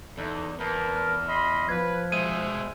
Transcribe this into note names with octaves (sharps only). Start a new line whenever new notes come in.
E2 D#4 E4 A4
E2 A#4 B4 A5
F6
D#5 B5 C6
F3 B4 G#6
B2 G#3 G#4 C5 E5 D#7